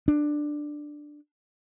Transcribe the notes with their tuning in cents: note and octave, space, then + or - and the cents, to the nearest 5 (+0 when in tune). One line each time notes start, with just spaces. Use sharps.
D4 +10